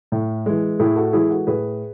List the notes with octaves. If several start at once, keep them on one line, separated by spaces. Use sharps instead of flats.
A2
E3 G#3
A2 E4 G#4
F#4 A4
E3 G#3 E4 G#4
F#4 A4
A2 G#4 B4